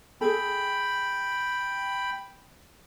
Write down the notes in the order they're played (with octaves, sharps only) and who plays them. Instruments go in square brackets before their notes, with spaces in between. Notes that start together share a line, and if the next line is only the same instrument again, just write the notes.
[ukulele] G#4 A4 [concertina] G5 B5